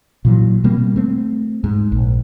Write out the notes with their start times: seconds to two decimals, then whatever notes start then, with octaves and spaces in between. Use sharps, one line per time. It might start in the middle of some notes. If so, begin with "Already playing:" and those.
0.25 A#2 E3 F#3
0.64 B2 G3 A#3 C4
0.96 A3 C4
1.64 G#2
1.92 A#1